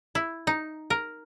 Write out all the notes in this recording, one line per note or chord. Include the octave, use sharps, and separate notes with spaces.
E4
D#4
A#4